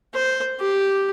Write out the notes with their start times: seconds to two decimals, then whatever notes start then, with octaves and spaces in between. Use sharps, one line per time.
0.14 C5
0.60 G4